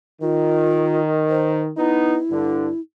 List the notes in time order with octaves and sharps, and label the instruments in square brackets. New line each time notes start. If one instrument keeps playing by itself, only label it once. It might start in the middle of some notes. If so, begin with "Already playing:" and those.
[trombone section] D#3 [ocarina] F4
[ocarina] C5
[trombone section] B3 D#4 [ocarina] E4
[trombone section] G2 D3